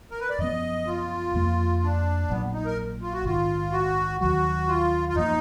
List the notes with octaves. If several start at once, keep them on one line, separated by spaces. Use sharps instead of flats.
A#4
B4
D5
F#2 F3 B3 D#5
F4
F2 F3 A#3
D4
A#1 A#2 F#3 B3
D#4
A#4
F4
F#4
A#1 G#2 D#3 F4
F#4
D#2 D#3 F#3 F#4
F4
F4
F#2 F3 A#3 D#4